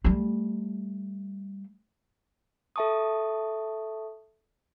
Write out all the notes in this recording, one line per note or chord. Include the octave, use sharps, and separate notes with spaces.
G3 A3
A4 E5 A5 C#6 D#6